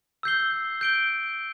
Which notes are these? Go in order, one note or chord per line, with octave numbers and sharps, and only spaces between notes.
E6 G6 C7 G7
G6 D7 G7